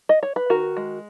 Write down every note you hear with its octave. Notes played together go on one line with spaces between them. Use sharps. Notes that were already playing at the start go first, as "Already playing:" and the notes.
D#5
C#5
B4
D#3 F#4 A#4
G#3